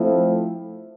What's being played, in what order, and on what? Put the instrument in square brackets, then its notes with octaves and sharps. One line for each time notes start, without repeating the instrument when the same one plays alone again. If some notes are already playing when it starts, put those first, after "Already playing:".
Already playing: [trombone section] F3 A3 C4 E4 A4